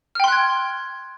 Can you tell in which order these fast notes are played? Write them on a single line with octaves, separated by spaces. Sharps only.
F6 G5 C6 F#6 G#6